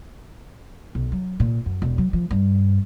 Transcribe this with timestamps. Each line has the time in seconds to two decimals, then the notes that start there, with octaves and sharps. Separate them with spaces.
0.95 B1
1.12 F#3
1.40 A#2
1.66 F#2
1.82 E1
1.98 F#3
2.13 F3
2.31 G2